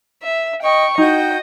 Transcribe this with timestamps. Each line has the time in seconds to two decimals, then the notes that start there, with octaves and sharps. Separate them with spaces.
0.23 E5
0.62 D#5 G5 C#6
0.98 D#4 F#4 D#5 G5 G6